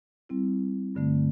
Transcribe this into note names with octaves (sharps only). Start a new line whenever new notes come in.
G3 C4 E4
G2 D3 A3 C4